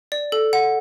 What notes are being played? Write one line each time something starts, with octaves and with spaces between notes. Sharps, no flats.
D5
A4
F#5